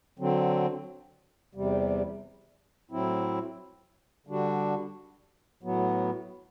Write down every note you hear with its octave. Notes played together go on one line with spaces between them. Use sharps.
D3 F#3 C4
E2 C3 G3
A2 F#3 C4 E4
D3 G3 D4 F#4
A2 F#3 B3